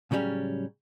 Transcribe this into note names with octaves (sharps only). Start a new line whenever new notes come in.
A2 C#3 F#3 G3 C#4